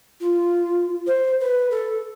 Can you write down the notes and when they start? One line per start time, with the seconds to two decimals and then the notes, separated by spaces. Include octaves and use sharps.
0.21 F4
1.07 C5
1.40 B4
1.71 A4